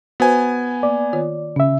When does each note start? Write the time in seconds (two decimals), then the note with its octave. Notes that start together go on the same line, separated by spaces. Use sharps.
0.20 B3 F#4 B4 C5 G#5
0.83 A#3 D5
1.13 D#3 F4 C#5
1.56 C#3 C#4 E5